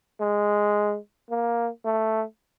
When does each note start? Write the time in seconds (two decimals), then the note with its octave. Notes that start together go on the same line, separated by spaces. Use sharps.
0.20 G#3
1.30 A#3
1.85 A3